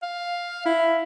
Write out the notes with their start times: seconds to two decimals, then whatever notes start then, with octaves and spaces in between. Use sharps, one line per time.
0.02 F5
0.65 E4